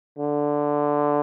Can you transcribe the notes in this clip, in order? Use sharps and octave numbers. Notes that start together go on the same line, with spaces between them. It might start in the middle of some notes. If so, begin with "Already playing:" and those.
D3